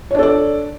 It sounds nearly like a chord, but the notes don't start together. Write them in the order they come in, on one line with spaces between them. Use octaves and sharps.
C#5 D4 A4 D5